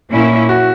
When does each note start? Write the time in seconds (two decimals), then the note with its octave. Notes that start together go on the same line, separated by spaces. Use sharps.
0.12 A#2 A#3 C#4 E4
0.49 F#4